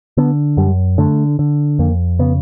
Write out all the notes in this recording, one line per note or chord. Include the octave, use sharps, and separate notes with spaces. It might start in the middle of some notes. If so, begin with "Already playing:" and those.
D3 B3
F#2 G3
D3 A3
D3
F2 A#3
C#3 B3